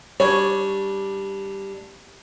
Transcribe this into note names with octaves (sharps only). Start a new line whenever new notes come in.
G3 D4 C#5